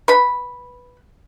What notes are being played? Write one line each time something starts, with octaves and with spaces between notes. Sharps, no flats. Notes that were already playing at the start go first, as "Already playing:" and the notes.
B4 B5